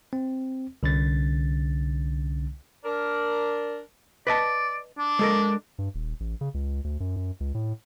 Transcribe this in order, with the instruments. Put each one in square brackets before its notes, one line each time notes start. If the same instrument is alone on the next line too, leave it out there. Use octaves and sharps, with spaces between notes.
[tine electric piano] C4
C2 D3 C#4 A6
[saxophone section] D4 A#4
[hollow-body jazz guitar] B4 D#5 A5 [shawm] D5
[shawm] D4
[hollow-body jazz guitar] G#3 A4 A#4
[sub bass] G2
D#1
A1
C#3
C#2
D2
F#2
F#2
C#2
A2